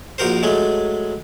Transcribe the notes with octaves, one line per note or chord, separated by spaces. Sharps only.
A#1 F#4 A#4 C5
F#3 G#3 A3